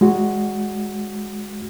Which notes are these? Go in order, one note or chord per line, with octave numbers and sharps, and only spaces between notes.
G#3 F#4